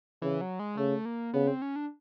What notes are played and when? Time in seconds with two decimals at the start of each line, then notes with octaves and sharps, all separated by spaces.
0.22 C#3 E3
0.41 F#3
0.59 G#3
0.77 C#3 A3
1.05 A#3
1.34 C#3 B3
1.47 C4
1.62 C#4
1.76 D4